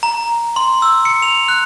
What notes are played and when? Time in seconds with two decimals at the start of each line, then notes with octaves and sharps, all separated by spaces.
0.03 A#5
0.56 C6
0.82 E6
1.05 C#7
1.22 F7
1.48 F#6